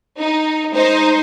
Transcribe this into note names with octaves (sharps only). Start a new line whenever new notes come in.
D#4
G#3 D#4 C5